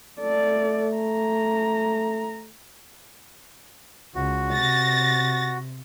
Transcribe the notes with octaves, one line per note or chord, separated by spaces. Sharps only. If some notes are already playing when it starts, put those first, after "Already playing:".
A3 A4 D5
A#5
C#2 F#4
C3 A6 A#6